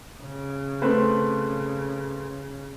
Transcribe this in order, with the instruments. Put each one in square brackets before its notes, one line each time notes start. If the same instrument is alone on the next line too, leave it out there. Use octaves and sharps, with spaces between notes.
[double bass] C#3
[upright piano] A3 C4 B4